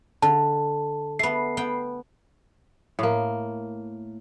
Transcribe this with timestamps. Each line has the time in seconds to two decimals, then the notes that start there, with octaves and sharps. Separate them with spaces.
0.22 D3 A5
1.19 A3 B3 C7
1.57 B3 G5
2.99 A2 A#3